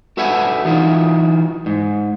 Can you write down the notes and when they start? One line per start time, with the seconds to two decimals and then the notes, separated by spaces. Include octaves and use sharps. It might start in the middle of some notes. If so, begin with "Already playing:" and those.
0.17 F#4 A4 B4 E5 F#5 G#5
0.65 E3 D#4 F4 F#4
1.66 G#2